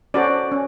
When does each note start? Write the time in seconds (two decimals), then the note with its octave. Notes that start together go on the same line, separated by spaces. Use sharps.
0.14 C#4 F#4 A4 C5 D5
0.52 C#4